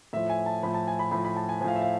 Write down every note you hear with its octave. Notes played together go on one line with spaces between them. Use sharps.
A2 F3 E5
G#5
A5
A2 F3 B5
A5
G#5
B5
A2 F3 B5
B5
A5
G#5
A2 F3 F5 G#5
E5
F5